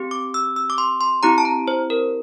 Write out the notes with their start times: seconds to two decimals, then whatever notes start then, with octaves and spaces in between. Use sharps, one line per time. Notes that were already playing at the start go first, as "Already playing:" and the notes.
Already playing: C4 G4
0.11 D6
0.34 E6
0.56 E6
0.70 D6
0.78 C6
1.01 C6
1.23 C4 E4 G4 A#5
1.38 A5
1.45 A#5
1.68 C5
1.90 A#4